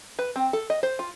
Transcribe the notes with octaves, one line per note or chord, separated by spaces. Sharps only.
B4
C4
A4
D#5
C5
F4